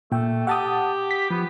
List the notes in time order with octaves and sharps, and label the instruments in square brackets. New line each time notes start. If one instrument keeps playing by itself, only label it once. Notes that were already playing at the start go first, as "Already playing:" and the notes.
[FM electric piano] A#2 G5 [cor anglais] A3
[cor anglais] G4 [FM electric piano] F#5 A5 D#6
[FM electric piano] B6
[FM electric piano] F3 [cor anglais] B3